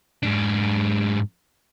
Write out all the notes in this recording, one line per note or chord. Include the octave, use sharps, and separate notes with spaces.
G#2 D4